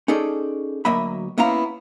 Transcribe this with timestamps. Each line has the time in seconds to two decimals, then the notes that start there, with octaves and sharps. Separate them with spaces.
0.08 C#4 D#4 G#4 A4 D5
0.85 D2 F#3 A#3 D#5 E5 B5
1.38 A#3 B3 C#4 E4 F5 A#5